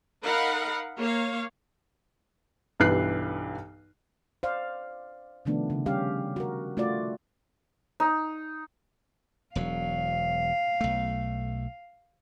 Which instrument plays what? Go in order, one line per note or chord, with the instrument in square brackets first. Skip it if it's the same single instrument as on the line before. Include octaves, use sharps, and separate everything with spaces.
[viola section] D#4 A#4 F5 F#5 B5
A#3 C#5 F5
[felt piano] B1 G2 E3 B4 F#6 C7
[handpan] C5 D5 F5
C3 D#3 F3 A3 B3 D4
C#3
G3 C#4 G4 F5
F#4 A#4
A3 F4 F#4 D5
[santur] D#4
[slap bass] E1 F#3 [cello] F5
[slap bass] B1 A3